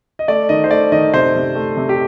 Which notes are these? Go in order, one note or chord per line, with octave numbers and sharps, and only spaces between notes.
D#5
A3 D5
D#3 D#5
C5
A3 D5
D#3 D#5
C3 C5
C3
A3
C3
G4